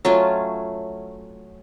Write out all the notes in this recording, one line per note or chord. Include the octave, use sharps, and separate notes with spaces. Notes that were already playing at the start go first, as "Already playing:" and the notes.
F#3 A3 C#4 F4